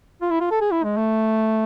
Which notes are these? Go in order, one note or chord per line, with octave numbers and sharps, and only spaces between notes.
F4
E4
F4
A4
G#4
E4
G#3
A3